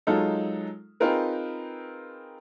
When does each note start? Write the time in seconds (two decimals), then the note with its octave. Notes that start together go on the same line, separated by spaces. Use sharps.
0.07 F#3 G#3 D#4 F4 A4
1.00 C4 D#4 F4 G#4 A#4 B4